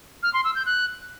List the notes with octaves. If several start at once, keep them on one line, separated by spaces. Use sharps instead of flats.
F6
C6
E6
G6
F#6